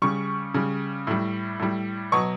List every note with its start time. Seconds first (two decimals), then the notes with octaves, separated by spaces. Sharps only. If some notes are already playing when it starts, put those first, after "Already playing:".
0.02 C#3 G3 C#6
0.54 C#3 G3
1.07 A2 G3
1.59 A2 G3
2.12 B2 F#3 C#6